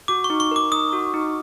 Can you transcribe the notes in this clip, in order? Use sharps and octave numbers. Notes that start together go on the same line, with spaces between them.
F#4 D6
C#6
D#4
C#6
A#4 D6
D#4 D#6
F#4
D#4